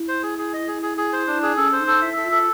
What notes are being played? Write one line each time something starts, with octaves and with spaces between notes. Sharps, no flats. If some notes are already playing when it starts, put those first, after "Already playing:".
Already playing: E4
C5
G#4
G#4
D#5
G#4
G#4
G#4
C5
D4
G#4
C#4 A4
C5
D#4
A4
E4 E5
A4
F4
A4